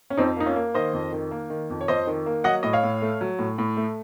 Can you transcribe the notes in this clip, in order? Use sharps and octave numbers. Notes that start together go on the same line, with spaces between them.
C#4
F2 C4 D#4
A#3 D#4
C#4 F4
A#3
D#3 C5 D#5
F2
D#3
A#3
D#3
F2
C#5
F2 C5 D#5
D#3
A#3
F#3 D#5 F#5
A2 D#5
C#5 F5
A2
A3
F#3
A2
A2
A3